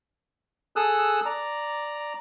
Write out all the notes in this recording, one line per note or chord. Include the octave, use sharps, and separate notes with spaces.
G#4 A4 D#6 E6 F#6
D5 A#5